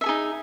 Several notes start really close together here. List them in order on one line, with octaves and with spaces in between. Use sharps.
E5 A4 G#4 D#4